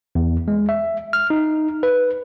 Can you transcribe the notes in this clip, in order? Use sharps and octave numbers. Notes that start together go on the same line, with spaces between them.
E2
G#3
E5
F6
D#4
B4